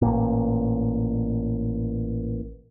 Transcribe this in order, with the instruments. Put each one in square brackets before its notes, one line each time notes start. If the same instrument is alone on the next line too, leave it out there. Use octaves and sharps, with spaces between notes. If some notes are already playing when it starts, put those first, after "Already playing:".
[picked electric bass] A1 A#2